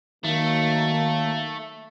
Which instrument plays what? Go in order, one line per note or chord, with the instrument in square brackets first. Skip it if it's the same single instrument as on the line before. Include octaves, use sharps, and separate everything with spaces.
[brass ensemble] D#3 F#3 A#3 [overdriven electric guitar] A3